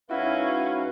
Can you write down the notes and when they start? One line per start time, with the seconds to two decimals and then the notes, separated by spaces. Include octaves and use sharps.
0.10 G#2 C#4 E4 F#4 B4 F5